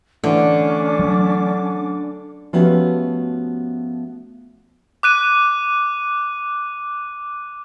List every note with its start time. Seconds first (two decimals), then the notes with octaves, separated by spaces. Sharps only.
0.24 D3 E3 A3 C#4 D4 D6
0.99 F#3
2.53 F3 A3 B3 C#4 F#4 G4
5.03 D6 F#6 D#7